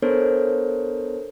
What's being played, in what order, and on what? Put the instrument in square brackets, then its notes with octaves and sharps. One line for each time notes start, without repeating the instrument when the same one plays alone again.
[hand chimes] B3 D4 A4 A#4 C5 C#5